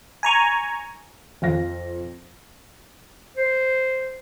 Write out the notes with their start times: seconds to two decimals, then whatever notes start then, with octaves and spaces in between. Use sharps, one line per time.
0.23 G#5 A#5 C#6
1.42 F2 F5 A#6
3.37 C5